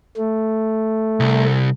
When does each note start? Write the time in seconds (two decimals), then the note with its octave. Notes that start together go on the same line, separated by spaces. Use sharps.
0.17 A3
1.20 C2